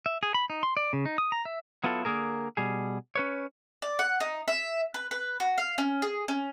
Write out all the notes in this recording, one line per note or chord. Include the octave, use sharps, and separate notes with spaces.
E5
G#4
B5
D#4
C6
D5
C#3
D#4
D#6
A#5
E5
F#3 B3 E4 F4 A4
D3 A#3 G#4 A#4
B2 G3 G#4
C#4 B4 C#5
D5
F#5
D#4
E5
B4
B4
F#4
F5
C#4
G#4
C#4